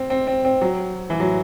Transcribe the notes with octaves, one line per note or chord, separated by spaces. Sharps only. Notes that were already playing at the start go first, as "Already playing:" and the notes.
Already playing: C4
C4
C4
C4
F#3
E3
F#3